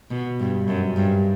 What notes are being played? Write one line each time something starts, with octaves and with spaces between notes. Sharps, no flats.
B2
G2
F#2
G2